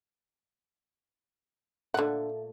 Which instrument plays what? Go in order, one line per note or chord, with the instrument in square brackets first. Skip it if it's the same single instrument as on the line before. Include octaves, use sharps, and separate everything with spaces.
[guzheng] A#2 A3 [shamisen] D3 F#5